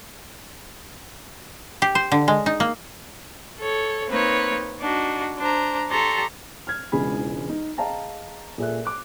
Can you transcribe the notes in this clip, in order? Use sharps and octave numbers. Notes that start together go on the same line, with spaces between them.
G4
C5
D3
G#3
D#4
A#3
A4 C#5
A#3 C4 D#4 B4 C#5
D4 D#4 F#4
D4 C5 A#5
G4 A4 D5 A#5 C6 C#6
F6 G#6
E1 C#2 E3 D4 G#4 B5
D#4
G#4 D#5 F5 G5 A5 A#5
A#2 G#4 A4 E5 F#6
D6 F#6